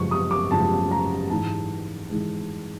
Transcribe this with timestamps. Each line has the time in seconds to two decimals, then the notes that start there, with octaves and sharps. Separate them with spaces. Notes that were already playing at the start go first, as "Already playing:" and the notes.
Already playing: F#2 C#3 F3 G#3 C#6
0.11 D#6
0.31 D6
0.51 F#2 C#3 F3 G#3 A5
0.91 A#5
1.30 G#2 E3 G#3 A5
2.10 G#2 E3 G#3